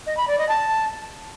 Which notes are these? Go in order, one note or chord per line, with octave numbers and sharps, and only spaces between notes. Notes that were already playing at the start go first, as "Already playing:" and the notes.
D#5
B5
D5
D#5
A5